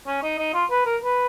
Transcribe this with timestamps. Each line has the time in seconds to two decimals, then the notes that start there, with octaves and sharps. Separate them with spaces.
0.07 C#4
0.23 D#4
0.39 D#4
0.54 F4
0.70 B4
0.86 A#4
1.02 B4